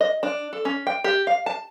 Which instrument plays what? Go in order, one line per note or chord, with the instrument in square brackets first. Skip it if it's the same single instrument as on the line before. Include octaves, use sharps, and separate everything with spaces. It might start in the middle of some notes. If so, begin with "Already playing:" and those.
[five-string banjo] D#5
D4
A4
C#4
G5
G4
F5
A5